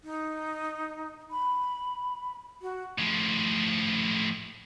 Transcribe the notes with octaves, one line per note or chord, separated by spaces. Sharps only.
D#4
B5
F#4
A2 F3